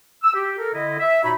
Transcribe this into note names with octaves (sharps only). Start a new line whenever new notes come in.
E6
G4
A4 A#4
D3 E4 D#5
E5
A#2 D#4 F#4 C#5 B5